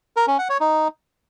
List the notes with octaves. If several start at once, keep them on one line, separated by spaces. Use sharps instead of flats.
A#4
C#4
F#5
C#5
D#4